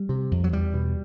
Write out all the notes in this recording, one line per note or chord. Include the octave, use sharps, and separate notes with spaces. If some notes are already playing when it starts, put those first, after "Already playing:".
Already playing: G3
C3
F2
F#3
E2 G3
B2